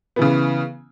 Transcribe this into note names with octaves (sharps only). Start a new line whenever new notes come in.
C#3 E3 B3